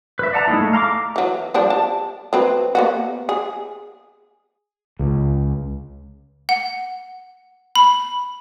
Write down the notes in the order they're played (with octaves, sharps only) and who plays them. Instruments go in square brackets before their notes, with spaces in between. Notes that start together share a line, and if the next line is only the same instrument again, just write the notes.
[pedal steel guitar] B4 E5
D5 F#5 A5 A#5
G#3 A#3 D#4 E4
A3
F5 A#5 C6 D6
[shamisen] E3 F#3
F3 G3 D4
A5
F#3 C4 B4
A#3 B3 F#4
G#4
[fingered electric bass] C#2
[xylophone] F#5
B5